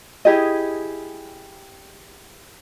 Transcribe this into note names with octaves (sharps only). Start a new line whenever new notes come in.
E4 G4 G#4 D#5